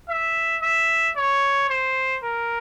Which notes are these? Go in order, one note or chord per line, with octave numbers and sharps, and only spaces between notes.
E5
E5
C#5
C5
A#4